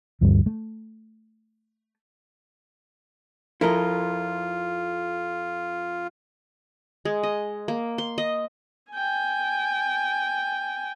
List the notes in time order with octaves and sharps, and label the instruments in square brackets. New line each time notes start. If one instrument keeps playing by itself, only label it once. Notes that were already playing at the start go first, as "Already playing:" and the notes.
[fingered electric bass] D2 G2 E3
A3
[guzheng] F2 D#5 [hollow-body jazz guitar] E4 A#4 [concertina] F4
[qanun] G#3
D#5
A#3
C6
D#5
[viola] G5 G#5